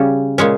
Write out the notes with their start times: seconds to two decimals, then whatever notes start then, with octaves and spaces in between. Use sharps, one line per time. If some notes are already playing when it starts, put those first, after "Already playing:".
Already playing: C#3 G3 C#4
0.38 A#2 G#3 C#4